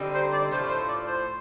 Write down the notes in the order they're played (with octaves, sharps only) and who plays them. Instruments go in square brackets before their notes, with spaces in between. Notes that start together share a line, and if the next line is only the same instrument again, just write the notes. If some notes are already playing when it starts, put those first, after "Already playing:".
Already playing: [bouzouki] D3 G3 C4 D#4
[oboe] C5
D5
[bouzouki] A2 F3 A3 [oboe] C5
[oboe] C5
D5
C5